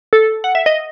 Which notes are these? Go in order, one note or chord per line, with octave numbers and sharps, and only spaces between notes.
A4
F#5
E5
D#5